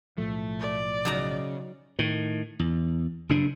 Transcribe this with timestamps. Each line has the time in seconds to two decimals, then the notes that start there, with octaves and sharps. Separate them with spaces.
0.18 B1 A2 F3 A3
0.60 D5
1.05 C#3 F#3 D#4 A#5
1.99 A2 D#3
2.59 E2
3.29 F#1 G2 C#3 D4